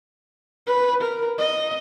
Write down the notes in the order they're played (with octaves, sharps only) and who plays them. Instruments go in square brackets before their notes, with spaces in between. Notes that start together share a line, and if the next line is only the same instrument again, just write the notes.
[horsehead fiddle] B4
A#4
D#5